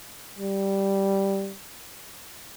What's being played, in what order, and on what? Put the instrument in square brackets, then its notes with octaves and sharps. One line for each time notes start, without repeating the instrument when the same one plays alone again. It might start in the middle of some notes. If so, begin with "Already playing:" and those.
[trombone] G3